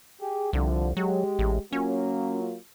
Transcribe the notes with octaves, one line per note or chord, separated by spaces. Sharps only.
G4 G#4
C2 D3 F3
F#3 G#3 G4
A1
F#3 A#3 C#4 F4